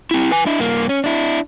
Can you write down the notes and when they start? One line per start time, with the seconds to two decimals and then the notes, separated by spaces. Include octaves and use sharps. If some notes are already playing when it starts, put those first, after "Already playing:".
0.11 C4 E4
0.31 B4 G#5
0.46 D4 E4
0.59 G2 A#3
0.89 C#4
1.04 D4 E4